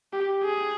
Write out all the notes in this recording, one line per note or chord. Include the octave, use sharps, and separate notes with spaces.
G4
G#4